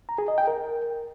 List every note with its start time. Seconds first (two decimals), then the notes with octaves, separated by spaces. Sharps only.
0.09 A#5
0.18 G#4
0.28 D#5
0.38 G5
0.47 A#4